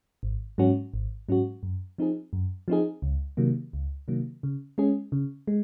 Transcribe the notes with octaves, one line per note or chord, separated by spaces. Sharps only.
G#1
G#2 F#3 C#4 F#4
G#1
G#2 F#3 C#4 F#4
F#2
F3 C4 D#4 G#4
F#2
F3 C4 D#4 G#4
C#2
C3 D#3 F#3 A#3
C#2
C3 D#3 F#3 A#3
C#3
G#3 C#4 G#4
C#3
G#3